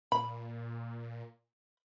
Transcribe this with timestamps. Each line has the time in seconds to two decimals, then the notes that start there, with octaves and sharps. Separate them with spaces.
0.12 A#2 B5